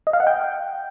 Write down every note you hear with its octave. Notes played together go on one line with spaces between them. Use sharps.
D#5
F5
F#5
G5